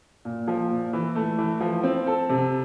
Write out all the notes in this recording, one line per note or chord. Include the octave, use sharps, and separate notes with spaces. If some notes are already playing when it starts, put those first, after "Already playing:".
A#2
F3
A#2
E3
A3
E3
F3
C4
A4
C3